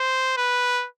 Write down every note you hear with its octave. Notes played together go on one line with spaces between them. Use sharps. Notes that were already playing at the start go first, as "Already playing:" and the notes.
Already playing: C5
B4